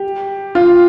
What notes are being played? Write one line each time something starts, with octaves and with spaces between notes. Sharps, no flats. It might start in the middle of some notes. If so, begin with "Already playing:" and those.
Already playing: G4
F4